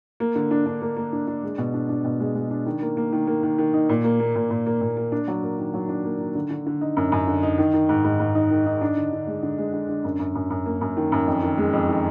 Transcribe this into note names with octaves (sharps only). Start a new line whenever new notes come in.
A#3
D3
D4
D4
A#3
A#3
D4
D4
G#3
B2
D4
D4
B2
G#3
G#3
D4
D#3
A#3
A#3
D#3
A#3
D#3
D#3
D#4
A#2
A#3
A#3
A#2
A#2
A#3
A#2
A#3
D4
F#3
A#3
D#3
F#3
D4
A#3
D#3
D3
D3
D3
D#4
F#2
F#2
D3
D#4
D#3
D#3
G#2
G#2
G#2
D#4
D#3
D#4
D4
D3
D3
G#3
D3
G#3
D3
D3
F#2
F#2
F#2
F#2
A#3
F#2
D#3
F#2
F2
D#3
G#3
F2
D#3